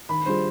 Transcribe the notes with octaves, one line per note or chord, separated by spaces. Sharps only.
D#3 B5
G3 D4 F4 G#4 C5